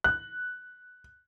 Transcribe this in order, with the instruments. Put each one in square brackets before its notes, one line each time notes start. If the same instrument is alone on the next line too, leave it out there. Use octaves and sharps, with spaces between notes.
[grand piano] F#6